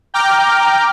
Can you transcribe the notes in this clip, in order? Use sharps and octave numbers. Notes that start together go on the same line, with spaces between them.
G5 A#5 D6 F6 G6